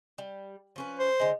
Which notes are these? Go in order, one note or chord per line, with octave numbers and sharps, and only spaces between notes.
G3
F3 C#4 B4
C5
D3 G#3